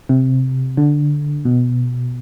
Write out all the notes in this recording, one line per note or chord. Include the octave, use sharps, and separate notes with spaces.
C3
D3
B2